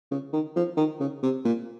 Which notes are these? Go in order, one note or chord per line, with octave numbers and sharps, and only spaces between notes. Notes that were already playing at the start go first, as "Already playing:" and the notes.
C#3
D#3
F3
D#3
C#3
C3
A#2